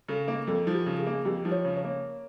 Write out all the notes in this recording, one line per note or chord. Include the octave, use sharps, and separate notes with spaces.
C#3 A4
A#3
F2 A4
F3
G4
C#3
G#4
A#3
F2 G4
F3
C#5
C#3
C#5
A#3